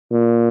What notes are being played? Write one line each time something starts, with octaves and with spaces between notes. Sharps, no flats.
A#2